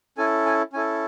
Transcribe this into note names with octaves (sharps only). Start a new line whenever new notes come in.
C#4 E4 A4 G#5
G#5
C#4 E4 A4 G#5